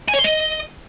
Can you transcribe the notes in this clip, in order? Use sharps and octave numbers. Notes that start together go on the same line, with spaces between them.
G#5
C#5
C6
D#5